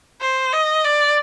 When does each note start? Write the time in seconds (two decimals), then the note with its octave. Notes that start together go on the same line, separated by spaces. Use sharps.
0.21 C5
0.53 D#5
0.84 D5